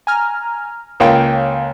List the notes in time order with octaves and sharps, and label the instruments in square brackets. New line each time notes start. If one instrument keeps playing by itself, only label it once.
[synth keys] G#5 A#5 F6
[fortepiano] C#2 A#3 [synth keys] C#5 F5 G5